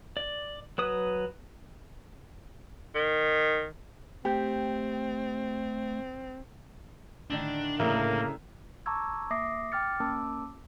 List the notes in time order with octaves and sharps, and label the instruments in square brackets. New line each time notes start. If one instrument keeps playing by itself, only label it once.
[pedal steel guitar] D5
F#3 B4 D#6
[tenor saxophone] D#3
[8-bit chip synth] A3 [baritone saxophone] C4 [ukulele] G4
[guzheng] A2 D3 D#3 [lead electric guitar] D4
[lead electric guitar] A2 [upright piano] C#3 E4 A#4 [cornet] A#3 [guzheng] A4
[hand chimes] A5 A#5 C#6 D6 E6 G#6
A#3 E5 D6 D#6 A#6 C7
G5 D6 F6 A6 C#7
A#3 C#4 A#4 A5 D6 E6